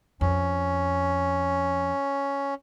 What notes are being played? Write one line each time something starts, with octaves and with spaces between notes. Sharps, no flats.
F2 C#4